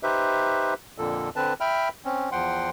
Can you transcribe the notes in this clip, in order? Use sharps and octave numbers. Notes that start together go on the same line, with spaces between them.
D#4 G4 B4 C5 E5
F2 A#2 D3 A4
D3 C4 B4 A5
E5 G5 B5 F6
C4 C#4
E2 F3 F#5 G5 C6